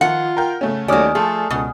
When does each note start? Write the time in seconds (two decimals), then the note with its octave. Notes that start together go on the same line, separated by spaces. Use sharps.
0.01 D#3 F3 F4 F#5
0.37 A#4 G5
0.61 C#3 A3 C#4
0.88 D#2 F#3 A3 C#4 D5 G#5 D#6 F6
1.15 F3 A3 G#4 A4
1.51 C#2 B2